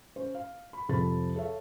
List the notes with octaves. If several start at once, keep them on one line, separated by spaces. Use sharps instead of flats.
C#4 C5
F5
B5
C2 F2 C3 A4 B5 A6
A4 C#5 E5 F5